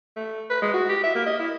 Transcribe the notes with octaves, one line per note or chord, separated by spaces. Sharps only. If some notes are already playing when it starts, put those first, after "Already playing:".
A3
B4
G#3
F#4
G4
E5
A#3
D#5
E4